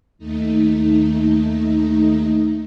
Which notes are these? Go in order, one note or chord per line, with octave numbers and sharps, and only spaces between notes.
D#2 A3 D#4